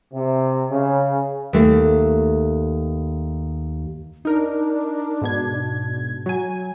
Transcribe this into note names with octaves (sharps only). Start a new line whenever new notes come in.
C3
C#3
D#2 A3
D4 D#4 A#4
G#2 B2 G#6
F#3 G#5